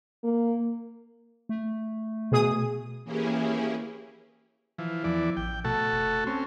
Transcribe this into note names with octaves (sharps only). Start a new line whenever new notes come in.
A#3
A3
B2 G#4 D#6
E3 A#3 C#4 E4 G4 G#4
E3 F3
E2 E3 F3 D5
A1 G5
B2 A3 F#4 A4
F1
C4 C#4